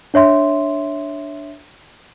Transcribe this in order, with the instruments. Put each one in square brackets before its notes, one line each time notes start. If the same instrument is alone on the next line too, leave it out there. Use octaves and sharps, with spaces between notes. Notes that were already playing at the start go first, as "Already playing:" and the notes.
[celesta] D4 C#5 E5 C6